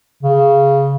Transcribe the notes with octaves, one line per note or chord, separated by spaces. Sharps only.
C#3